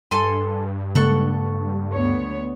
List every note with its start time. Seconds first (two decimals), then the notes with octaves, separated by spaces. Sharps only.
0.11 G2 A4 G#5 C6
0.95 C#3 G#3 A#3 A4 F#5 C#6
1.94 D2 B3 C#5